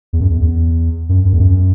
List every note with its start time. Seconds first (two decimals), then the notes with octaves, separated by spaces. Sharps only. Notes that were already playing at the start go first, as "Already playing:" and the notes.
0.13 E2
0.21 F#2
0.30 E2
0.41 E2
1.09 F#2
1.25 F#2
1.33 E2
1.40 F#2